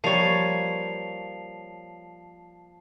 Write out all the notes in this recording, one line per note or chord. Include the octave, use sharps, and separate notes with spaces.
F3 G3 A#3 C#5 A5 C7 F7